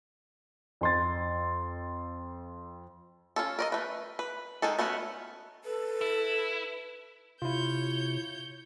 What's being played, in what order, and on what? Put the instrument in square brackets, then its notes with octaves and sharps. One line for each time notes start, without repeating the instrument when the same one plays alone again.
[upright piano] F2 C6 A6
[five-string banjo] C#4 F4 A4
A#4 D5 D#5
A3 B4
B4
D#3 G#3 G#4 A4
A3 B3 C#4 F4 F#4
[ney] A4 [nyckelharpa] B4
[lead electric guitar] E4
[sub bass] C3 [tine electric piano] E4 F4 [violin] C#5 G6